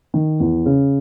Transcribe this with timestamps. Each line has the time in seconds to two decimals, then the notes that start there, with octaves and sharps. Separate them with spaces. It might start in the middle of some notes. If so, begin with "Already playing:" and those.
0.14 D#3
0.40 E2
0.66 C#3